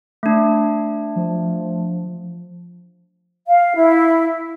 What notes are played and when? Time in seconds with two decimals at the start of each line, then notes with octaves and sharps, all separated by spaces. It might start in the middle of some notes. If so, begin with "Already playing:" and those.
0.23 A3 D4
1.16 F3
3.47 F5
3.75 E4